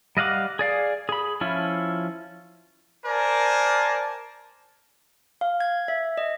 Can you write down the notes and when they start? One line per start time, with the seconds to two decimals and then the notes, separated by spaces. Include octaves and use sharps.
0.17 G3 D#5 F5 F#5 D6
0.59 G#4 D5 F5
1.09 G#4 B5
1.41 F3 C#4 E4 F4
3.05 A#4 C5 D5 G#5 A5
5.41 F5
5.60 G#6
5.88 E5
6.18 D#5